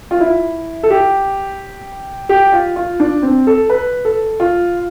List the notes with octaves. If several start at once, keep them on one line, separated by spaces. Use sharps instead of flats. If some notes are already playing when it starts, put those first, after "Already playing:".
F4
E4
A4
G4
G4
F4
F4
D4
C4
A4
B4
A4
F4